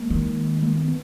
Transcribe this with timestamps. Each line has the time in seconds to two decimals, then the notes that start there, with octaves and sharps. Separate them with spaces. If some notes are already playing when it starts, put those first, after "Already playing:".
Already playing: G#3 A#3
0.10 D#3
0.62 G#3 A#3
0.75 A3 B3
0.88 B3